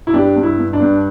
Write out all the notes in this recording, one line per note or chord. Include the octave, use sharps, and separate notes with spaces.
E4
G2 D4 G4
G2
E4
G2
D4
G2